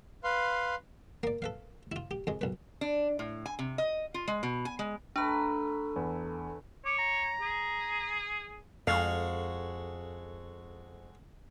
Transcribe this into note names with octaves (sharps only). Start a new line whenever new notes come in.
B4 F5 C6
A#3 D5
A4 B4 F5
E4 F4
G4
F2 G#3
B1 B4
D4
A2
G#5
C3
D#5
F4
G#3
B2
G#5
G#3
A3 D4 A4 B4 A5 A#5
E2
C#5 D6
A#5
G#4
F2 G#3 F#4 A4 F5